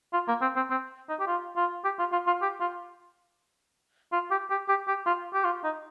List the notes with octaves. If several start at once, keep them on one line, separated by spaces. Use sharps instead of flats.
F4
A#3
C4
C4
C4
D#4
G4
F4
F4
G4
F4
F4
F4
G4
F4
F4
G4
G4
G4
G4
F4
G4
F4
D#4